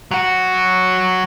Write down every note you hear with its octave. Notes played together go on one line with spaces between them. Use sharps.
F#3 F#4